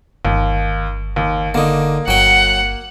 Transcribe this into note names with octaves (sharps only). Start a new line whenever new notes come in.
G1 D#2
D#2
D3 A#3 D#4
G1 F#3 F#5 G5